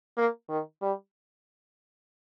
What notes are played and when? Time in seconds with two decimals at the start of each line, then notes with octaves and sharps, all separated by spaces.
0.17 A#3
0.49 D#3
0.82 G3